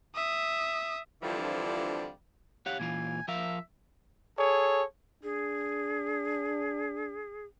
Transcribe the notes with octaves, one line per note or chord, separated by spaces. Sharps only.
E5 D#6
F2 D3 E3 F3 G3 D4
G4 C#5 F5 F#5
A#2 E3 F4 G#5
F3 A#4 E5 F5
G#4 A4 C#5
D4 G#4